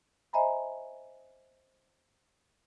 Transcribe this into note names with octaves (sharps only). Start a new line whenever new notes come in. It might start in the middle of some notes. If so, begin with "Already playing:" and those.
C5 D#5 E5 G#5 A#5 B5